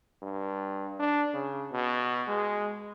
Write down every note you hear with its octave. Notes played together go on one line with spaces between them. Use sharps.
G2
D4
C#3
B2
G#3